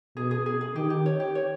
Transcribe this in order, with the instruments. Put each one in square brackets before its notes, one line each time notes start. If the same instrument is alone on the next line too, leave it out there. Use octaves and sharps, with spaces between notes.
[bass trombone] B2 [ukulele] G#4
[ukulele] G#4
G#4
G#4
[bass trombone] D#3 [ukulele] G4
[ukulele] G4
C#5
G4
C#5